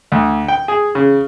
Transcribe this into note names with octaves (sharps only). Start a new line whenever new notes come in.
D2
G5
G#4
C#3